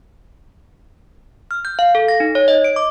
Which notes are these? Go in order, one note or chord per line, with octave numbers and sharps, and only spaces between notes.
F6
G6
F5
A4
A#6
D#4
C#5
D#5
D7
D6